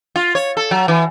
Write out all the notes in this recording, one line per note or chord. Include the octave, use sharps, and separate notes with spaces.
F4
C#5
A4
F#3
E3